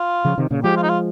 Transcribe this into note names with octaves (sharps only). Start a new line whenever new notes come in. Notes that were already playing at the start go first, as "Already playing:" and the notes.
Already playing: F4
C#3 F3
C3 D#3
A#2 C#3
F3 G#3 G4
F4
D#4
F4